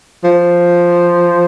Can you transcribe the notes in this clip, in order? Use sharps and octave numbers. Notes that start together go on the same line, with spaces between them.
F3